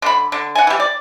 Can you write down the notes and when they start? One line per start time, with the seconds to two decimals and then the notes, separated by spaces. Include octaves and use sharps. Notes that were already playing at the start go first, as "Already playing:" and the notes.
0.02 D3 B5
0.32 D3
0.55 F#5 G#5
0.67 E3 G3
0.80 D5